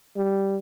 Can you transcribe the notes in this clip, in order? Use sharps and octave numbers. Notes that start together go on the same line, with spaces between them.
G3